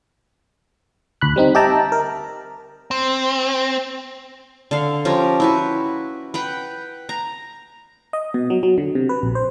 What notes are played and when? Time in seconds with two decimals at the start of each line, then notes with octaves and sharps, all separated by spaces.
1.21 D2 B5 F#6
1.36 G3 C4 D#4
1.55 G4 D#5 E5 G5 A5 A#5
1.92 A#4
2.91 C4
4.71 D3 F5
5.05 F3 C#4 G4 A#4
5.40 E4 F#4 B4
6.34 B4 F#5 G5
7.09 A#5
8.13 D#5
8.34 B2
8.50 F#3
8.63 F#3
8.78 D3
8.95 C3
9.09 B4
9.23 A#1
9.35 C5